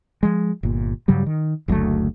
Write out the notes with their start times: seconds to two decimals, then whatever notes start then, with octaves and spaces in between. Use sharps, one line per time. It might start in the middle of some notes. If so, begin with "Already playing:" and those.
0.23 F3 G#3
0.63 G1 A#2
1.08 G2 C#3 F#3 G3
1.26 D#3
1.68 F#1 D2 F#3 A3